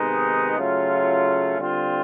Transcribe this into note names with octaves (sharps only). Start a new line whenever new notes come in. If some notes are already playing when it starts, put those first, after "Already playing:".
Already playing: C3 D#3 G#3 B3 D#4
C#3 F#3 A3 C#4 F4
D3 G3 C4 F4